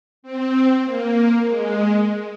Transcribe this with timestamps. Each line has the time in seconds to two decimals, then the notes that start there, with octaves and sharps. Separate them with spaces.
0.23 C4
0.84 A#3
1.47 G#3